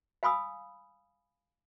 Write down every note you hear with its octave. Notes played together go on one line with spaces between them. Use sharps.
F5 G#5 B5 D#6 E6